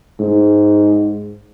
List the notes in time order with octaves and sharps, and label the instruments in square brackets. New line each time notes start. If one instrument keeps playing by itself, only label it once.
[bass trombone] G#2